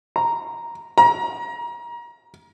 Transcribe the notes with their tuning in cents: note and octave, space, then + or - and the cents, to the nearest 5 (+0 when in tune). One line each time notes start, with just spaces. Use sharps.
A#5 +0
A#5 +30